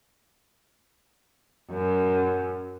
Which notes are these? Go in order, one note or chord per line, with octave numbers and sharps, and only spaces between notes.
F#2